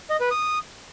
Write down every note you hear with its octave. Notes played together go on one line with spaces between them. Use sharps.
D#5
B4
D#6